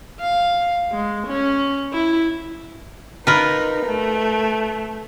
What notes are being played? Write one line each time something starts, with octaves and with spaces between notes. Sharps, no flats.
F5
G#3
C#4
E4
D#4 F4 A#4 B4
A3